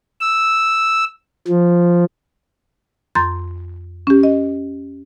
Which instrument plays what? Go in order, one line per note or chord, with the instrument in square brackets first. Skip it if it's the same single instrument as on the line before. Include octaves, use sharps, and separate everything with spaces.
[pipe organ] E6
F3
[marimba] F2 A#5 C6 G6 A6
C#4 G4
D#5